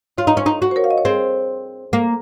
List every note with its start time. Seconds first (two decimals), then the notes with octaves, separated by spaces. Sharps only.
0.18 F4 C#5 F5
0.27 D#4
0.37 C#4
0.46 D#4
0.62 F#4
0.71 C5
0.76 A#4 C#5
0.84 F5
0.91 D#5
0.98 C#5
1.05 C4 G#4 C5
1.93 A#3